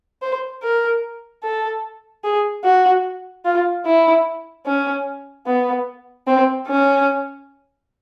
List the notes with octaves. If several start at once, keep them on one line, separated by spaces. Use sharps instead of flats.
C5
A#4
A4
G#4
F#4
F4
E4
C#4
B3
C4
C#4